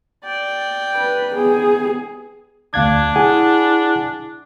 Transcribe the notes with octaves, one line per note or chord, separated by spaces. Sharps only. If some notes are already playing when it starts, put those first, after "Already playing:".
D5 G5
B4
B3 G#4
D2 D4 F5 G#6
E4 G#4 F#5 G#5